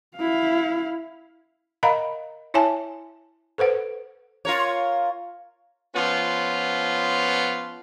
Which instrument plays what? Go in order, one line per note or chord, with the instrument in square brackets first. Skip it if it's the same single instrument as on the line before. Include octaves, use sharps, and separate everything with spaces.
[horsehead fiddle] E4 F5
[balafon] A#4 D#5 F5 F#5 A#5 B5
E4 C#5 E5 G#5 A5
A4 B4 C5 F#5
[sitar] F4 A#4 C#5
[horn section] F3 B3 C#4 F4